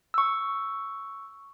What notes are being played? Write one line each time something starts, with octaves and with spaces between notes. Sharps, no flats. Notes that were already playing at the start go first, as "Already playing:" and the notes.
C#6 E6